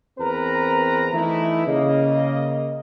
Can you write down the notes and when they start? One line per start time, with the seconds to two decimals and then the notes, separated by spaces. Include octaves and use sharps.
0.20 E2 C4 A#4 B4 A#5
1.13 E3 A3 D#4 E4
1.67 C#3 A#3 D#5